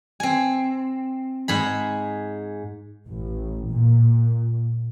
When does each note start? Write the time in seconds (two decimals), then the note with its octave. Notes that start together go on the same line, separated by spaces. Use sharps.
0.20 C4 G#5
1.48 G#2 G#4 B5
3.07 A1
3.70 A#2